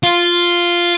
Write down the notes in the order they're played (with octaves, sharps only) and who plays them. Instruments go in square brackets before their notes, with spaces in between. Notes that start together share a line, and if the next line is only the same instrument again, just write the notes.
[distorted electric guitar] F4